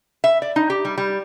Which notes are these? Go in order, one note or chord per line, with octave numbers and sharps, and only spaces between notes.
E5
D5
D#4
G4
G3
G3